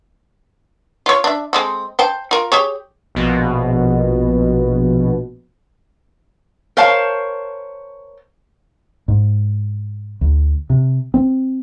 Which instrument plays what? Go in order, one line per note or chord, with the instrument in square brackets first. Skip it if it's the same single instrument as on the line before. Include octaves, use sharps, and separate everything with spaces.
[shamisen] F4 C#5
D4 E5
G#3 C4 A4
C5 G5 A5
F4 A#4
G4 G#4 C#5
[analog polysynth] A#1 B2
[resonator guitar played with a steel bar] A#4 C5 C#5 F5 A5
[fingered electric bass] G#2
D2
C3
C4